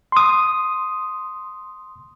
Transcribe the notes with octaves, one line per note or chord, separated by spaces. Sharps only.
C6 D#6